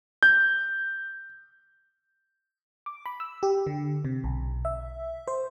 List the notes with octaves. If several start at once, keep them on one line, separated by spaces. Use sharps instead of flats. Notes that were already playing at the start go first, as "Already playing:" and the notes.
G6
D6
B5
E6
G4
D3
C3
B1
E5
C5